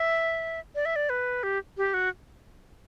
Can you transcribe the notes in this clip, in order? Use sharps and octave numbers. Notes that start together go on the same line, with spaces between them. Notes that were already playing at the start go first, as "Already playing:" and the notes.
Already playing: E5
D5
E5
D5
B4
G4
G4
F#4